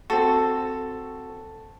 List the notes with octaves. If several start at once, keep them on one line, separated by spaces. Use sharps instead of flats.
C4 F#4 A4